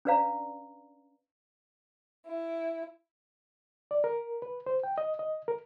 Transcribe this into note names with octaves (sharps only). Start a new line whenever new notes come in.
C#4 D4 B4 D5 F5 A#5
E4
D5
A#4
B4
C5
G5
D#5
D#5
A#4